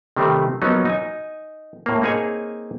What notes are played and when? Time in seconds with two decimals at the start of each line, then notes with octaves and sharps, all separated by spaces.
0.16 C3 D#3 G3 A3 C4
0.62 F3 F#3 A#3 B3 C#4 D#4
0.85 D#4 G#5
1.86 A2 A#3
2.02 A#3 C4 D#4 G#4 C#5 G#5